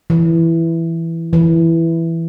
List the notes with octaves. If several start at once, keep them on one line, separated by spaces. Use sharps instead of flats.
E3
E3